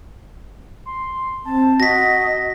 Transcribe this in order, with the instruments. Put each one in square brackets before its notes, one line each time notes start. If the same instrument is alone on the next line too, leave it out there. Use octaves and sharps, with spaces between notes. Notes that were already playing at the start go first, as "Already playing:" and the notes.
[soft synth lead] C6
[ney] C4 [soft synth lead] A5
[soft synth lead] F#4 [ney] D#5 [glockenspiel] A#6 B6